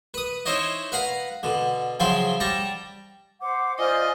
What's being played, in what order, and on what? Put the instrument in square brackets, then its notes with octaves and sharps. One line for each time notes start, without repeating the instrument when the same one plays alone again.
[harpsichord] B4 D#6
D#4 E4 C5 C#5 D#5
B4 F5 F#5 A#5
B2 D3
C#3 F3 F#3 E4 G5 C6
G3 G5 A5 A#5
[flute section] C5 F#5 D6
[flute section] F4 D5 [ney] C5 [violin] D#5 [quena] G#5